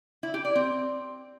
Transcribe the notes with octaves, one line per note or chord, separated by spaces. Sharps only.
E4
G4
D5
C4